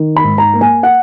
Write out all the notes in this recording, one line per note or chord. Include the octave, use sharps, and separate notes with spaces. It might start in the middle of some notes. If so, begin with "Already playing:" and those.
Already playing: D#3
B5
G#2
A#5
A#3
G#5
F#5